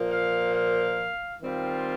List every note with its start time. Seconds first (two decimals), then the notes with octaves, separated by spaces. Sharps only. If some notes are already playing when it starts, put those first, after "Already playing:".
Already playing: A#2 F3 A#3
0.10 F5
0.54 F5
1.41 D#3 G3 C4 F4